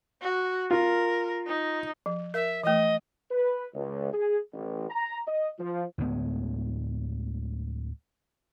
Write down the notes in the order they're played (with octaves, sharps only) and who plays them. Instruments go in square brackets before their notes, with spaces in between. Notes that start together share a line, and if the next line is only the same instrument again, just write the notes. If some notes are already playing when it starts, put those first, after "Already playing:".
[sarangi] F#4
[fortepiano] F4 [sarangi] A#4
[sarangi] D#4
[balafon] F3
[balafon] A#4 [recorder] E5
[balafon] E3 A3 [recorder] D#5
[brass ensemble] B4
C#2
G#4
A1
A#5
D#5
F3
[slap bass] D2 A2 G#3 B3